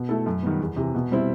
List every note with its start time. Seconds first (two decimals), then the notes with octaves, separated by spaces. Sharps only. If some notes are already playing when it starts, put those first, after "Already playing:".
Already playing: B2
0.09 A3 E4 A4
0.26 F#2
0.43 D#3 G3 B3
0.60 E2
0.77 C3 E3
0.95 B2
1.11 G3 C4 E4